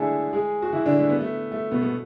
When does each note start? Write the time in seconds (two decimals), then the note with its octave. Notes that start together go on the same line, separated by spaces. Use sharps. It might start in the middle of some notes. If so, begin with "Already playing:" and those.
Already playing: D3 E3 G#3 A3 D4 E4 G#4 A4
0.33 G#3 G#4
0.62 F#4
0.73 E3 E4
0.86 D3 D4
0.99 A3
1.09 B3
1.20 A3
1.52 A3
1.71 B2 B3
1.82 B3